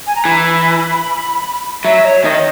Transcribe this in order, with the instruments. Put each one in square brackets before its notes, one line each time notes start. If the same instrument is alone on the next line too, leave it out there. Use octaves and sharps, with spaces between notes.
[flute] G#5
A#5
[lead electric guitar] E3 [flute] B5
[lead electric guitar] F#3 [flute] E5
[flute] C#5
[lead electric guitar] D#3 [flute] D#5